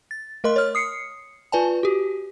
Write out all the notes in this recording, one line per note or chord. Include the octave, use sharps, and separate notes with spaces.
A6
A3 A#4 D#5 C6
C#5 F6
D#6 C7 C#7
F4 B4 D5 G#5 A5
F#4 G4